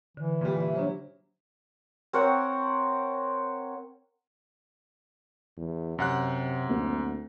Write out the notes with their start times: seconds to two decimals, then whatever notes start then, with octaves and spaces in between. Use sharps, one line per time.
0.17 D3 E3
0.41 A#2 G3
0.61 E5
0.76 F#3 D4 C5
2.13 C4 A#4 C#5 F#5
5.57 E2
5.98 F#2 C3 F#5 F#6
6.69 D2 A#3 C4